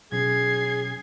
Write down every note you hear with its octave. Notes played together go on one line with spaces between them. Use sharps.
B2 F#3 C#4 G#4 G#6 C7